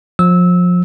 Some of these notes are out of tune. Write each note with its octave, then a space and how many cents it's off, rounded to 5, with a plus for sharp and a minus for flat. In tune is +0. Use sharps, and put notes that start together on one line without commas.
F3 +30 E6 -20